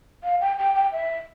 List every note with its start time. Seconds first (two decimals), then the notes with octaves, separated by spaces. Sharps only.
0.24 F5
0.41 G5
0.59 G5
0.75 G5
0.92 E5